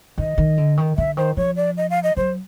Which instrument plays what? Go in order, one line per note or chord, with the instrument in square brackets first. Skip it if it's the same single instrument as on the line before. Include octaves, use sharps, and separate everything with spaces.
[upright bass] D#3 [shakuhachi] D#5
[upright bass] D#3
D3
D#3
[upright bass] D3 [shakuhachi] E5
[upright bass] D#3 [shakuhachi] C5
[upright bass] F3 [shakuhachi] C#5
[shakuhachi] D5
D#5
F5
D#5
[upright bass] F#3 [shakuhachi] C5